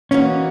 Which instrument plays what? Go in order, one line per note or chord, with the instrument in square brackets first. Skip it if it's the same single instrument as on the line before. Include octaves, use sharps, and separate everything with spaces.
[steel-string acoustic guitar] E3 A#3 D#4 F#4 [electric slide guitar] C#4